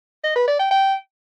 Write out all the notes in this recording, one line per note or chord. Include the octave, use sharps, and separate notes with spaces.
D#5
B4
D5
G5
G5